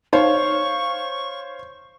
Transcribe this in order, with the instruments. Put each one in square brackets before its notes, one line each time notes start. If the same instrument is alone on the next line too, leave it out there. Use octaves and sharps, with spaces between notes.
[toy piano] D#4 [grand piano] C5 [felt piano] C#5 F5 [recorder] C#6